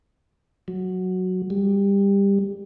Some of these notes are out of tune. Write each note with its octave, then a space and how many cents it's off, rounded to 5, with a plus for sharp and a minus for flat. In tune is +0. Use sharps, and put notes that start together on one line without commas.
F#3 -5
G3 +20